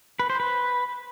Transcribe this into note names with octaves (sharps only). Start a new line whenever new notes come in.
B4
C5
B4